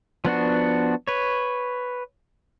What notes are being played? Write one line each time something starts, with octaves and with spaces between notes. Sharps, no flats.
F3 B3 D4 F#4
B4 C#5